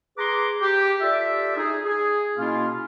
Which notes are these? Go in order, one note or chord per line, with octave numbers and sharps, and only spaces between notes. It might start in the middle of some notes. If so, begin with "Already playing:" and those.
G#4 B4 A#5 C6 D6
G4
F4 G4 A4 D5 E5
D#4 G#4
G#4
B2 A#3 C#4 E4 F4